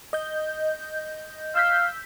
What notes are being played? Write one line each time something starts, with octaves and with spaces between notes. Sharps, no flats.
D#5 G6
F5 E6 G6 B6